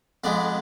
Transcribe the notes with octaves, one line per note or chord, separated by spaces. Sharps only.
F2 F3 G#3 B3 D5